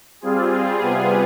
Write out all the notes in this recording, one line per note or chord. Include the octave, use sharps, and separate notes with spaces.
G3 C4 F4 G#4
C3 G3 B3 F4 G#4